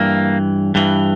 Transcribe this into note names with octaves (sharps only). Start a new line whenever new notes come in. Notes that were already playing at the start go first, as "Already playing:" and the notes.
Already playing: G2 E3 A#3
G2 E3